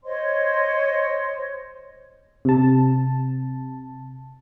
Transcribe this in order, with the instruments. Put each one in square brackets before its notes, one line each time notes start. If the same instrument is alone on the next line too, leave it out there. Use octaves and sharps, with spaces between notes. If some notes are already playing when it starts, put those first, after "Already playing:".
[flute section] C5 C#5 D#5 C6
[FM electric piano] C3 A5